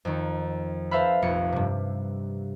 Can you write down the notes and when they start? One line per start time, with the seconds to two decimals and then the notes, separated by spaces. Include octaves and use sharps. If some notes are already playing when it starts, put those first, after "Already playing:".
0.05 F2 D#3
0.91 A4 B4 C5 E5 F5 B5
1.22 F1 A#1 F2 C#7
1.52 G2 C3